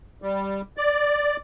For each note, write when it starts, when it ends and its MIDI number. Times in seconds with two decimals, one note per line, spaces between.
0.22 0.61 55
0.77 1.36 74